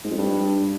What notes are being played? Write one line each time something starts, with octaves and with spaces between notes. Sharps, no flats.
G#2
F2
G2